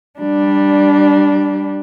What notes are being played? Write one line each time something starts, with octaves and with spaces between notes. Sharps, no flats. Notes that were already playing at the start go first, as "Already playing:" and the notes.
G3 D4